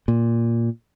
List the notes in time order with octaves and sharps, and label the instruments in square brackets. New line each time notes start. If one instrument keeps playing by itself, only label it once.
[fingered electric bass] A#2